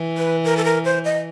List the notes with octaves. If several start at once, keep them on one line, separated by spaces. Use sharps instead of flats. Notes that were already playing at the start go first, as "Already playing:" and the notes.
Already playing: E3
B4
A#4
A4
A#4
C5
D#5